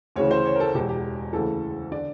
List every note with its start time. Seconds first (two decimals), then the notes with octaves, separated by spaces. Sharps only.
0.16 D2 C#3 E3 C#5
0.31 C5
0.46 C#5
0.56 A#4
0.60 A4
0.74 E1 E2 B2 G4
0.89 G4
1.33 D2 C#3 E3 A4
1.92 D3 D5